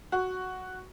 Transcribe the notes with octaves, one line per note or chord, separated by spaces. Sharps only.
F#4